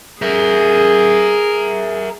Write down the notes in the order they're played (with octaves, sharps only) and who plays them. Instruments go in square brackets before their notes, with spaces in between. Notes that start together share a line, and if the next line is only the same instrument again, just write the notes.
[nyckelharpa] G#4 [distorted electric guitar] A#4 E5